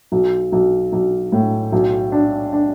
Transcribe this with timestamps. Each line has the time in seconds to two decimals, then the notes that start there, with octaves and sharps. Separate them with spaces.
0.12 B1
0.52 B1
0.92 B1
1.32 A2
1.72 B1
2.12 D4
2.52 D4